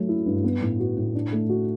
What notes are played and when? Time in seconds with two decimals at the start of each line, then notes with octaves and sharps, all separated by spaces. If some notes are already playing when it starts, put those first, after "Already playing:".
Already playing: F#3 A3
0.09 E4
0.26 G2
0.44 B3
0.61 A2
0.80 F#4
0.97 A2
1.15 D4
1.32 A3
1.49 F#4